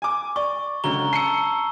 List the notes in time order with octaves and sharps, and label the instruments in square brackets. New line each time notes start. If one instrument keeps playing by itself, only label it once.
[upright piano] G#5 D6
[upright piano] D5 [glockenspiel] C#6
[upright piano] C#2 D3 F#3 [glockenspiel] A#5 G7
[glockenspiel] A5 E6 [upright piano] C7 C#7